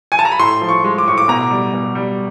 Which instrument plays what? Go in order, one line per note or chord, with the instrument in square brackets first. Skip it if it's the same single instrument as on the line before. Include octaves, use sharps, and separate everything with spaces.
[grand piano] G#5
A5
A#5
B5
A2 C6
F3
C#6
G#3
D6
A2 C#6
D6
B2 A#5
G3
B2
G3